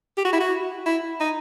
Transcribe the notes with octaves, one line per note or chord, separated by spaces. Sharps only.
G4
F#4
E4
F#4
E4
D#4